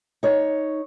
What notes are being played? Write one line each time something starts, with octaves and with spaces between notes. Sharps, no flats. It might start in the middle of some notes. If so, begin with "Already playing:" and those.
D#4 C#5